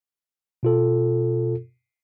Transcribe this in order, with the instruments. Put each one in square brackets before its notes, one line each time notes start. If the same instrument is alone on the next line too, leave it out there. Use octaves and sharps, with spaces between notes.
[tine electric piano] B2 F4 A4